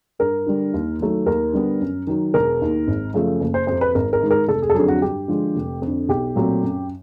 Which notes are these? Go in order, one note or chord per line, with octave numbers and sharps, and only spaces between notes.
G2 A#4
D3 G3
D#2
D#3 F#3 A3
D#2 A#4
D3 G3 B3
F#2
D#3 F#3
E1 A#4
D#2 D#3
G#1
F#2 C#3 F3 A3
F#1
C5
F2 C3 C5
B4
G#1 A#4
A#4
G#2 D#3 G#3
A#4
F1 A4
G#4
A4
F2 D3 F#3 G#4
F#4
G2 G4
D3 F3 G#3
F1
F2 D3
B1 G4
A#2 F#3 A3 C4
F#2